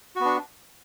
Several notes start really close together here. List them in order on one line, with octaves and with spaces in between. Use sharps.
F#4 B3 D4